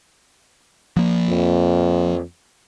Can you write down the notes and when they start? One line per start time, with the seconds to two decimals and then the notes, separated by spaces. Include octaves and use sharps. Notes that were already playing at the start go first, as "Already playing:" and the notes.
0.97 F3 A#3
1.28 F2